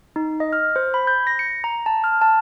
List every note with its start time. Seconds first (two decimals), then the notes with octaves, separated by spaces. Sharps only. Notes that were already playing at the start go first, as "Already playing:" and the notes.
0.16 D#4
0.40 D#5
0.53 F6
0.76 C5
0.94 B5
1.07 G6
1.27 A#6
1.39 C#7
1.64 A#5
1.86 A5
2.04 F6
2.22 A5